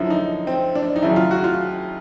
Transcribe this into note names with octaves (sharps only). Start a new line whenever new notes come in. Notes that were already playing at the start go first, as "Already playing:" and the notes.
Already playing: F#2 D3 F3 E4
D#4
C4
D4
D#4
D#2 C#3 F#3 E4
F4
F#4
F4